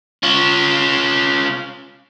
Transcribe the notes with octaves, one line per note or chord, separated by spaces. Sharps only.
C#4 F4